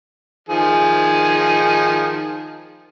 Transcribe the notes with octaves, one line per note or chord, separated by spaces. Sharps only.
D#3 F3 G#4